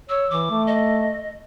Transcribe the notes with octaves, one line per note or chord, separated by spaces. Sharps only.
C#5 E6
E3 D6
A3
D#5